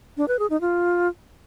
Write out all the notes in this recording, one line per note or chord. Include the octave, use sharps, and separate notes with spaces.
D4
B4
G#4
D#4
F4